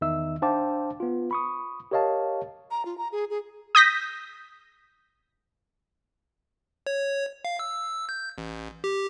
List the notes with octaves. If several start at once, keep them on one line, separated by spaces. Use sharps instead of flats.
E2 D#3 D#4 E5 E6
D4 C5 F5 G5 A5 D6
B3 F4
B5 C#6 D#6
G4 A#4 C#5 D#5 F5 A5
A#5
F4
A#5
G#4
G#4
D#6 G6 A#6 B6
C#5
F5
E6
G6
A1
G4